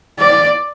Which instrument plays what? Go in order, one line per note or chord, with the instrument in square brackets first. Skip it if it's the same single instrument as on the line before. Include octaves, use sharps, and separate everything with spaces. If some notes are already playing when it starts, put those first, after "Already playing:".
[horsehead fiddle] D5